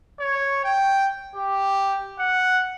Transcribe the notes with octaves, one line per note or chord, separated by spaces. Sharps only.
C#5
G5
G4
F#5